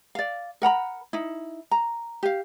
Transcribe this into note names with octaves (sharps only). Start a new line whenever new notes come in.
D5 F5
A#4 F#5 A#5 B5
D#4 E4
A#5
G4 F5